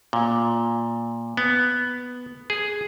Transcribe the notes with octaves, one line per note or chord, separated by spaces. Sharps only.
A#2
B3
G#4